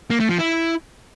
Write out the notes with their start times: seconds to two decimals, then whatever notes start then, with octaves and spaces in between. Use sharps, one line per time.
0.10 A#3
0.20 A3
0.29 F3
0.39 E4